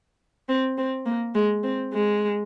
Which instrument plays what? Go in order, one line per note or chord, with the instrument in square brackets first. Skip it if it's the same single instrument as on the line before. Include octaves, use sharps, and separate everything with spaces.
[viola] C4
C4
A#3
G#3
C4
G#3